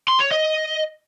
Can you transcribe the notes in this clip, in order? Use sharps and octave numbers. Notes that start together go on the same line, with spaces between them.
C6
C#5
D#5